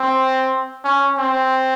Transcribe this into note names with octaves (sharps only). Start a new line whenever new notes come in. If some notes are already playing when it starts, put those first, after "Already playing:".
Already playing: C4
C#4
C4